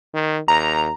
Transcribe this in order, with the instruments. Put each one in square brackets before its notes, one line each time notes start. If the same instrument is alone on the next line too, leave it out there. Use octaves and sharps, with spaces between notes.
[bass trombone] D#3
[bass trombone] D#2 [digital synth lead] A#5